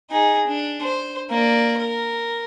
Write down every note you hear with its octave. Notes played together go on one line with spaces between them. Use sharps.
D#4 G#4
D4
C5
A#3 D5
A#4